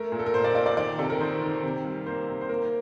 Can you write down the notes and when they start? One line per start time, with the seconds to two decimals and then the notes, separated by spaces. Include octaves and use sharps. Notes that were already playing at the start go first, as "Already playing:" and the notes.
Already playing: A3 A#4
0.12 A#2
0.19 A4
0.26 A#4
0.34 A#2 C5
0.44 D5
0.55 A#2 D5
0.66 D5
0.77 D#3 D5
0.99 C3 A4
1.10 A#4
1.20 D#3 C5
1.42 D#3
1.63 C3
1.85 G3
2.06 A#3 C5
2.28 C3
2.41 C5
2.49 A#3 A#4